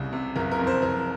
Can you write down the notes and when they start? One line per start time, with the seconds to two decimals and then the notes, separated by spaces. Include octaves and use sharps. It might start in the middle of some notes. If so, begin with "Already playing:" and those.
Already playing: C2 C#3
0.13 C3
0.36 F#1 A#4
0.52 A#4
0.59 F2
0.67 C5
0.82 F#1 A#4